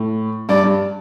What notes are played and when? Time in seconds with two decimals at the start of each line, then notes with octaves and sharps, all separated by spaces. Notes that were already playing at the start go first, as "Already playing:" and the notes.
Already playing: A2
0.49 G2 D5
0.64 G2